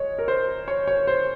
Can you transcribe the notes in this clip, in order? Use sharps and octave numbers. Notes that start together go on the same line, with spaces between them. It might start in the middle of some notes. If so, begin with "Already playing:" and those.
Already playing: G#3 C#5
A#4
C5
C#5
C#5
C5